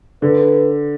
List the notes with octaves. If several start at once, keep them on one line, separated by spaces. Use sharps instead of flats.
D3 B4